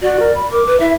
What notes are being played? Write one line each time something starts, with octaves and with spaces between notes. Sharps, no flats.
F#4 D5
A#4
B5
A#4 D6
B4
E4 E5